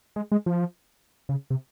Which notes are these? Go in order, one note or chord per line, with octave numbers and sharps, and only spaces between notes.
G#3
G#3
F3
C#3
C3